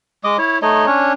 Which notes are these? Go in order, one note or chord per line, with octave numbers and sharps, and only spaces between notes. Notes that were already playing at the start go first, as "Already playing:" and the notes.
G#3 D#5 D6 D#6
E4 C#5
A3 D#4 C#5 D#5
C#4 D4 C#5